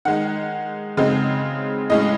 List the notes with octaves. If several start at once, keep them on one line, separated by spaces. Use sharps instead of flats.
D#3 G#3 D#4 F#5
C#3 G#3 C4 D#4
A2 G#3 C#4 D#5